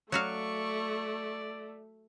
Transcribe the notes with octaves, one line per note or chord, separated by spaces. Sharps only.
F#3 A3 F#4 D5 F5 C#6